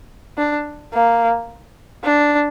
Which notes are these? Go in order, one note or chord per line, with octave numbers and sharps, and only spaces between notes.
D4
A#3
D4